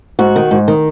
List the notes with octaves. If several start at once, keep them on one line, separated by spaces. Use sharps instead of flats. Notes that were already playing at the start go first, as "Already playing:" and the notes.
G#2 F#4
D#3
G#2
D#3